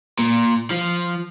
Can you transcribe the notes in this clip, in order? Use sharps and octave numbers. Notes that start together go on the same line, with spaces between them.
A#2
F3